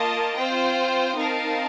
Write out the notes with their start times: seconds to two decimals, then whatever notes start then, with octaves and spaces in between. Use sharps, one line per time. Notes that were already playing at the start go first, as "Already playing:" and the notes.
Already playing: A#3 F4 A#4 D#5 A5
0.37 C4 F4 C5 G5
1.15 C4 D#4 A#4 F5 A5